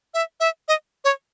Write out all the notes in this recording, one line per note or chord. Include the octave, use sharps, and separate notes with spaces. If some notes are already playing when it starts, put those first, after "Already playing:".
E5
E5
D#5
C#5